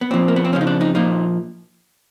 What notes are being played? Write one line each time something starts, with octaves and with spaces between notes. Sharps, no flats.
B3
A#2 F3 C4
A#3
B3
C4
F2 C#3 F3 C#4
D#4
D4
D#4
A#2 F3 D#4